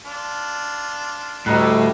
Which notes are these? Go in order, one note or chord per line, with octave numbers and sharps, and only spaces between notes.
D4 F4
D2 A2 G3 D#5 A#5 F#6